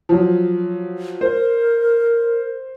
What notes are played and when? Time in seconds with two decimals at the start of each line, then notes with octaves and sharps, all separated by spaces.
0.09 F3 F#3
1.21 A#4 C5